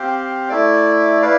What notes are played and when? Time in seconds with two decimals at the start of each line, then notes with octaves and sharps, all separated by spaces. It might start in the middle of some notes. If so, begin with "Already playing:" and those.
Already playing: C4 G4 C5 F5
0.49 A3 E4 A4 D5
1.22 E4 B4 D5 F5